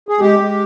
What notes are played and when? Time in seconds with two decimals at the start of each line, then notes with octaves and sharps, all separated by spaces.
0.09 G#4
0.19 G#3 G4
0.40 G#3